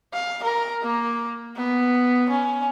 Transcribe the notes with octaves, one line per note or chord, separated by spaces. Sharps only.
F5
A#4
A#3
B3
C#4